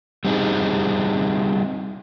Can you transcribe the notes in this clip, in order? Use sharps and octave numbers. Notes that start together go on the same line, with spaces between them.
G3 C4 D#4 G#4